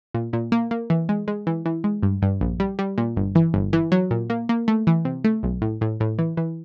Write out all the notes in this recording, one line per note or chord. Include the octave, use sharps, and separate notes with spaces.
A#2
A#2
A#3
A#3
E3
G#3
G#3
E3
E3
G#3
G2
G2
A#1
G3
G3
A#2
G1
E3
G1
E3
F#3
A#2
A#3
A#3
A3
E3
C3
A3
B1
A2
A2
A2
E3
E3